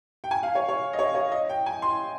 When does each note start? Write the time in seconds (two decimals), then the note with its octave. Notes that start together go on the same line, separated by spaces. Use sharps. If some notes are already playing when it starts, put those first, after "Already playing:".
0.24 G5
0.31 G#5
0.43 F5
0.55 C#5
0.68 C#5
0.93 D#5
0.99 C#5
1.15 C#5
1.32 D#5
1.49 G5
1.66 G#5
1.82 C6